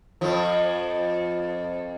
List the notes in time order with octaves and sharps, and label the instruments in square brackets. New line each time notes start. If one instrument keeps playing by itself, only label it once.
[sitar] F2 F3